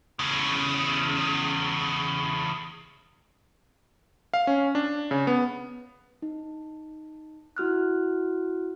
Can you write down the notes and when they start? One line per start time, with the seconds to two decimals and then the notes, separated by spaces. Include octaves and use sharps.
0.19 E2 C#3
4.34 F5
4.47 C#4
4.75 D4
5.11 C#3
5.27 B3
6.22 D#4
7.56 E4 F#4 F6 F#6